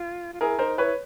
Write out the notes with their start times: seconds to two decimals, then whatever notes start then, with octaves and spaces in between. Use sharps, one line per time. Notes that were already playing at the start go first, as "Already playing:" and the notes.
Already playing: F4
0.33 F4
0.41 E4 G#4 A#4
0.59 D#4 A#4 C5
0.77 E4 B4 C#5